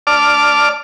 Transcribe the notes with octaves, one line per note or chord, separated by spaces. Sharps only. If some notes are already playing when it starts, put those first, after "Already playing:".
D5 A5 D6 F6